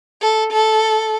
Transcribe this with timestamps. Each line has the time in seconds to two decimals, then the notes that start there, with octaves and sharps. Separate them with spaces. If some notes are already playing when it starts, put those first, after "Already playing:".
0.21 A4
0.52 A4